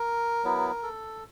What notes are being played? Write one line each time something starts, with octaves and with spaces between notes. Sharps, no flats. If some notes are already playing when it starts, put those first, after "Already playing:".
Already playing: A#4
F#3 B3 E4
A4